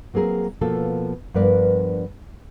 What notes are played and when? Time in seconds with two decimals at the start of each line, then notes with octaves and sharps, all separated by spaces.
0.14 F#3 A#3 C4 G#4 A#4
0.61 B2 F3 A#3 A4
1.34 G2 F3 B3 A#4 B4 D5